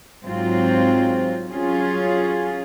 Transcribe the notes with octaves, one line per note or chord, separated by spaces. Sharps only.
G#2 F#3 C4 F4
F#3 C#4 F4 G#4